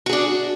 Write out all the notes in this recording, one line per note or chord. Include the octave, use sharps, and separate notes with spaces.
D4 F#4 G#4